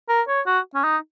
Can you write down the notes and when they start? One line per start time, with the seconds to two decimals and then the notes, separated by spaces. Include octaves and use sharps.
0.09 A#4
0.28 C#5
0.46 F#4
0.75 C#4
0.84 D#4